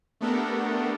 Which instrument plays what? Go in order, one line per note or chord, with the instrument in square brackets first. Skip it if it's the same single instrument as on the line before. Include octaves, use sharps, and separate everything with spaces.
[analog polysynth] A3 B3 D4 G4 A4 A#4